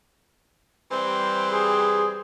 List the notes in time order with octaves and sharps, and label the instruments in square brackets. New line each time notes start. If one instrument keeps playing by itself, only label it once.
[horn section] E3 G3 C4 [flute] C6
[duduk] G#4